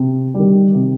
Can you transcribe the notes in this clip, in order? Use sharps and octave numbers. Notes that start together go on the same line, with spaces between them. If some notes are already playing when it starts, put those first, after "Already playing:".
Already playing: C3
D#3 G3
C3